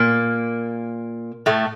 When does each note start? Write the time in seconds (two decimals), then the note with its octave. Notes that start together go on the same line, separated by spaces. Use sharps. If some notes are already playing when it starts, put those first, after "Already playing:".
Already playing: A#2 A#3
1.46 A2 A3